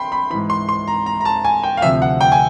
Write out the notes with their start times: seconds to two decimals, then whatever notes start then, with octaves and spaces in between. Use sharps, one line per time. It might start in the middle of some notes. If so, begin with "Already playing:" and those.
Already playing: G5 B5 C6
0.12 B5
0.30 E3 B5
0.35 G#2
0.50 C6
0.69 C6
0.88 A#5
1.06 A#5
1.21 A#5
1.25 A5
1.45 G#5
1.63 G5
1.77 F5
1.82 D2 C3 F3 E5
2.02 F#5
2.21 G5
2.32 G#5